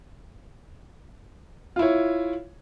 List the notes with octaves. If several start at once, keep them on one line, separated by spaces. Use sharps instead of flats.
E4 F4 C#5